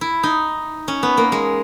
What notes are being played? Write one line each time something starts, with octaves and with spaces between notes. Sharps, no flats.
E4
D#4
C#4
B3
A#3
G#3